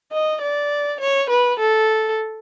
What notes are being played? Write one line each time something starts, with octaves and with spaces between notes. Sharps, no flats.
D#5
D5
C#5
B4
A4